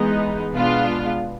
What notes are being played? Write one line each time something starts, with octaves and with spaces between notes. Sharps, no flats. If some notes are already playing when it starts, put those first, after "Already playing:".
Already playing: E3 G#3 B3 D#4
B2 G#3 B3 D4 F4